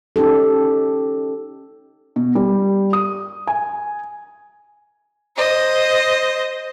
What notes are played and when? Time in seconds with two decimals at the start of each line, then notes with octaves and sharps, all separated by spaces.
0.16 C#4 D#4 G4 A4
2.16 B2
2.35 G3
2.93 D#6
3.47 G#5
5.36 C5 D#5